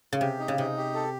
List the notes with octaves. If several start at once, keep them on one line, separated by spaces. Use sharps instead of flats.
C#3
C3 G4
D#4
C#3
C3 D#4
G4
A4